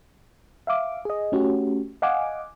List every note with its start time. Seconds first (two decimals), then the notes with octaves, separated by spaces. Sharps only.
0.67 E5 F5 D6
1.05 G#4 D#5
1.32 A3 C#4 F#4 G4
2.02 D#5 F5 F#5 G#5 D6